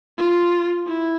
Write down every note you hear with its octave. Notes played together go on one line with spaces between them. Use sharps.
F4
E4